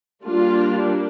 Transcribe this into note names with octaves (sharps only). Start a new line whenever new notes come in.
G3 A#3 D4 F4